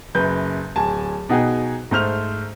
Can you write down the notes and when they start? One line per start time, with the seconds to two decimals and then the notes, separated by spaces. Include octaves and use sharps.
0.15 F#1 F#2 B4 G6
0.76 D1 G#5 A5
1.29 B2 D#4 F#4 G#4 G5 G#5
1.91 G#2 A3 C5 F6 F7